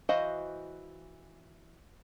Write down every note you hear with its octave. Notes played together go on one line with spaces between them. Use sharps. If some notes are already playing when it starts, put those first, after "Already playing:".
E3 F#4 C5 D#5 F5